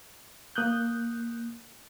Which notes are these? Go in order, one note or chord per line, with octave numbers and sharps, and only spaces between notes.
A#3 D#6 F#6 G6